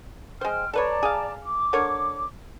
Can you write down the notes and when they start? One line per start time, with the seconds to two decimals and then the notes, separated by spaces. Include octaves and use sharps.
0.41 G#3 C5 G5 F6
0.73 A4 B4 C#5 D5 A5 A#5
1.03 G#4 F5
1.42 D6
1.73 D3 A#4 C#5